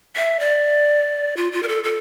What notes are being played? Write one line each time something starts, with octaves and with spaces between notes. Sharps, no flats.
E5
D5
F4
F4
A#4
A4
A4